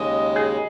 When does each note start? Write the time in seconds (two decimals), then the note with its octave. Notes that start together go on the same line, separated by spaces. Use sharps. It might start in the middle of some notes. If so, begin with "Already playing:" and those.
Already playing: D#2 C#3 G#3 D#5
0.36 G#4